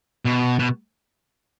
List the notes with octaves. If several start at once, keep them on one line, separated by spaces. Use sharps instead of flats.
B2
B2